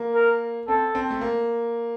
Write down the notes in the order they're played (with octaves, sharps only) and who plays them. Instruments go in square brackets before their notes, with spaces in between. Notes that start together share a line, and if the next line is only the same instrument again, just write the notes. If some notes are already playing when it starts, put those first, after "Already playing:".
Already playing: [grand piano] A#3
[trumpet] A#4
[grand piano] C4 [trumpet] A4
[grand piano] C4
A3
A#3